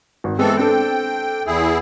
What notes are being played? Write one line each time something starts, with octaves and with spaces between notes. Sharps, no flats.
G#1
E3 G#3 B3 C4 A4
C4 D4 A4 G5
E2 E4 G#4